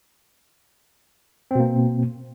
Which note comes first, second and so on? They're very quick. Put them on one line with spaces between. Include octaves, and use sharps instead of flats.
C4 B2 A#3